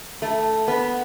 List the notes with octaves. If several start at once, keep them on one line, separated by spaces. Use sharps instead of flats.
A3
B3